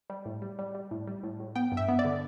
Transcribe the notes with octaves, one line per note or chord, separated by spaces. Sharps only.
G3
A2
G3
G3
G3
A2
G3
A2
A2
B3 G5
G2
E5
B3
D5
D3